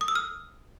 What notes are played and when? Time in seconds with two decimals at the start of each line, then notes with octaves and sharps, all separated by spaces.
0.01 D#6
0.08 E6
0.15 F6